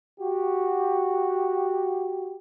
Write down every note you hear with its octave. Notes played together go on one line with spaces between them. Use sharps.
F#4 G4